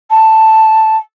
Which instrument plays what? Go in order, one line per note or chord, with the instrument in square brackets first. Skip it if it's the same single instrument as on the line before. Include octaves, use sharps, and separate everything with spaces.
[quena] A5